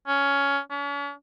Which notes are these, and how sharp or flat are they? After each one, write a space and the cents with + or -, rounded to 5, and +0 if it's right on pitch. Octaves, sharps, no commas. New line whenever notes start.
C#4 +15
C#4 +40